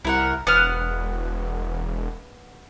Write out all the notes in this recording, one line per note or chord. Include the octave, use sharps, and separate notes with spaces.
C2 E4 A#4 F#5
E1 B3 F#5 F6